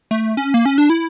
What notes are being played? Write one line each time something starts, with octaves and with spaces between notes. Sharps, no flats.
A3
C#4
A#3
C#4
D4
E4